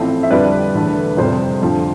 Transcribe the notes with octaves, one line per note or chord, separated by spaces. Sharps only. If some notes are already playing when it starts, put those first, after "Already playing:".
Already playing: A1 A2 F3 A3 C4 C5
E5
F2 D3 G3 D4 B4 D5
E1 E2 D3 A3
F2 C3 G3 C5
F2 D3 F3